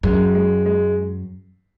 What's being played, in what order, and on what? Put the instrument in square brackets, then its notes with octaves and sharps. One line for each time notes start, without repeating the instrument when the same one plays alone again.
[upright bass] F#2 [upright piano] G#3
[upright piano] G#3
G#3